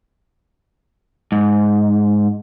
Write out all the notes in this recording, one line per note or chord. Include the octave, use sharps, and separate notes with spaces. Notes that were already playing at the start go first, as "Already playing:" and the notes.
G#2